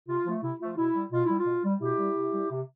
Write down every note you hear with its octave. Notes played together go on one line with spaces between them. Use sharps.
C3 F4
F3 A3
C3 E4
F3 A3 F4
B2 E4
G3
B2 F4
G3 E4
F4
B2
G3
B2 E4 G4
G3
C3
G3
C3